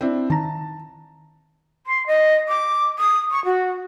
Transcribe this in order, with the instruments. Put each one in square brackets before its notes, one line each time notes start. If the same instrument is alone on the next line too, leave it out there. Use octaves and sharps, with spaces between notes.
[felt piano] C4 D4 E4
[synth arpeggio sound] D#3 A#5 [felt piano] A5
[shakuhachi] C6
D#5
D6
D#6
C#6
F#4